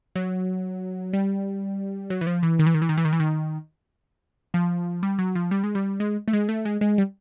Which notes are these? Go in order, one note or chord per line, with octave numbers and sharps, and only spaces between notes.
F#3
G3
F#3
E3
F3
E3
D#3
E3
D#3
E3
D#3
E3
D#3
E3
D#3
F3
G3
F#3
F3
G3
G#3
G3
G#3
A3
G#3
A3
G#3
G#3
G3